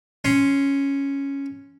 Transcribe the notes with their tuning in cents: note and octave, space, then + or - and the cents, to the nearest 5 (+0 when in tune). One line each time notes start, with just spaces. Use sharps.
C#4 +0 C6 +0